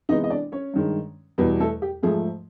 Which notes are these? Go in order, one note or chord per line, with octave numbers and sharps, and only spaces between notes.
C3 E3 G#3 B3 D#4 D#5
D#5
D4 D5
C#4 C#5
G2 D#3 G#3
E2 B2 G3 B3 B4
A3 A4
G4
G#2 F3 A3 G#4